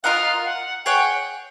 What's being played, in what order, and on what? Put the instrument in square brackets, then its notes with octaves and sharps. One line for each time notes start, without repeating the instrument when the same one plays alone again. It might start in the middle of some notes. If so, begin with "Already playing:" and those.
[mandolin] F4 A#4 D#5 F#5 [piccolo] F5
[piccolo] F#5
[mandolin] G#4 C#5 F#5 [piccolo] G5